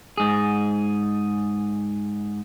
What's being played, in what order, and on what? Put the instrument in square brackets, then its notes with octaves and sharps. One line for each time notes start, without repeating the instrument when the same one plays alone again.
[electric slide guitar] G#2 G#4